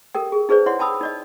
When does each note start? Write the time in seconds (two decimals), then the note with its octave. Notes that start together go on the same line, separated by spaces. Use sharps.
0.15 G4 A4 A#4 G5
0.32 G#4
0.49 D#4 G#4 B4 C5 D5
0.66 E4 C#5 D5 F#5 C6
0.79 G5 A5 B5 D#6 E6
1.01 D#4 D5 D#5